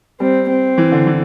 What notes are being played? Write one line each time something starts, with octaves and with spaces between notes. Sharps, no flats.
G3 C4
C4
E3
D3
E3